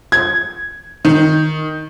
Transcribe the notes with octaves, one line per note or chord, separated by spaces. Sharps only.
G#6
D#3